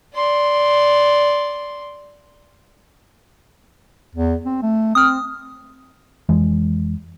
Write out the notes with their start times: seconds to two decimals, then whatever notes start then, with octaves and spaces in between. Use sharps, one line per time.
0.15 D5 C6
4.15 E2
4.45 C4
4.62 A3
4.95 C4 D#6 F6
6.29 F2 E3 G#3